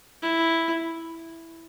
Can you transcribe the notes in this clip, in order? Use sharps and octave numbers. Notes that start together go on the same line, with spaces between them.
E4